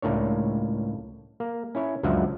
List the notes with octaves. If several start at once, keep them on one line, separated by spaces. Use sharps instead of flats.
C#2 A2 A#3 D4 C#5
A#3
C#4 E4 C#5
C#2 F#2 F3 D4 E5 F#5